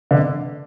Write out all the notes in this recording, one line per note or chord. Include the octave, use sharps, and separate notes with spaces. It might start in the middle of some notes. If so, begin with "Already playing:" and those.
D3